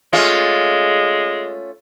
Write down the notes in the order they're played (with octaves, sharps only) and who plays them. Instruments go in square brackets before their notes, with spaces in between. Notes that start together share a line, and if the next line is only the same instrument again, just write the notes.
[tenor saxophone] G#3 [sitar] A3 C#4 F4